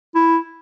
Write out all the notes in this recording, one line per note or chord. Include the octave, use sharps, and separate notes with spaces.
E4